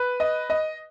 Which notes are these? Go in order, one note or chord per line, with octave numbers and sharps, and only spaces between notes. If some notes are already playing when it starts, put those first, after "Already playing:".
Already playing: B4
D#5
D#5